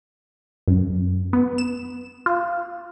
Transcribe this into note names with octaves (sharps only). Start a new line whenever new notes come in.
F#2
B3
E7
F4